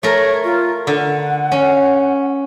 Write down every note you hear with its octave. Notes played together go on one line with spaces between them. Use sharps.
A3 A#4 C#5
F4
D3 F#5
C#4